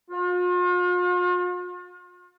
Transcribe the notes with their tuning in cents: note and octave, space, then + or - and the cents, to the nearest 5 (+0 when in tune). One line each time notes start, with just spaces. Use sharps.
F4 +40